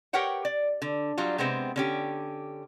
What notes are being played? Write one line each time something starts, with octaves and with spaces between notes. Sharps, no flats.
G4 A#4 B4 C#5 F#5 G5
D5
D3
F#3 G3 F4
C3 G#3 B3 C4
D3 C#4 G4